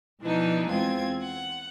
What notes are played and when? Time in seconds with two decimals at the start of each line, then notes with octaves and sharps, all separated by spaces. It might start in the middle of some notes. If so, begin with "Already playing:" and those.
0.22 B2 E3 F3 D4 D#4
0.70 E2 G#3 C4 F4 G#6
1.22 F#5